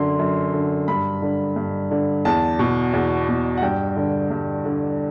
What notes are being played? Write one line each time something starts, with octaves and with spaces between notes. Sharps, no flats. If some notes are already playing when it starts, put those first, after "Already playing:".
Already playing: F#2 D3 C6
F#2
D3
G2 B5
D3
G2
D3
E2 A5
B2
E2
B2
F#5
G2 G5
D3
G2
D3